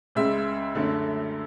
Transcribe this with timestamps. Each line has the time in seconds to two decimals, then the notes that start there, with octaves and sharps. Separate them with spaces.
0.15 C#2 C#3 G#3 E5
0.75 F#2 D3 A3